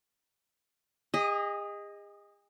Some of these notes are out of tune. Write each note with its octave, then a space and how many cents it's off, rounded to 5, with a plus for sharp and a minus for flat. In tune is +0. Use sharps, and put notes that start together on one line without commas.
G#4 -40 D#5 +0